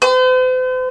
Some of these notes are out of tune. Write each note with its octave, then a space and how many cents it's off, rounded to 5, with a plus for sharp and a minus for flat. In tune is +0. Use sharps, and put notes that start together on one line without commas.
C5 -45